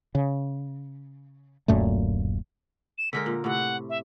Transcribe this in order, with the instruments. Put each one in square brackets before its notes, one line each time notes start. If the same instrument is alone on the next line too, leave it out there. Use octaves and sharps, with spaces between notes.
[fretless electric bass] C#3
D1 F#2 A#2 A3
[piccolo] E7
[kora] D3 G#3 A#4 [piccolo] B6
[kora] A#2
[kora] A2 C3 [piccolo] F#5
[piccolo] E5